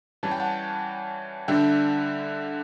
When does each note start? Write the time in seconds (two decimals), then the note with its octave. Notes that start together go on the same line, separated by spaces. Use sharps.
0.23 E3 G3 C#4 A5
0.31 G5
0.40 F#5 A5
1.48 D3 G3 D4 E5 G5